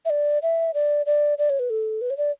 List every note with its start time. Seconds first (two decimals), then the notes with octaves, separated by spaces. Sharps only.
0.05 E5
0.10 D5
0.43 E5
0.74 D5
1.06 D5
1.38 D5
1.50 C#5
1.59 B4
1.70 A4
2.01 B4
2.10 C#5
2.17 D5